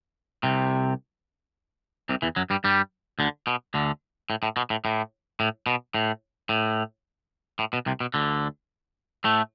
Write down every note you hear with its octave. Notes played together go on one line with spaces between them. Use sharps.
C2 C3
C2 C3
E2 E3
F#2 F#3
G2 G3
G2 G3
D2 D3
B2
D2 D3
A2
A2
B2
A2
A2
A2
B2
A2
A2
A2
B2
C2 C3
B2
D2 D3
A2 A3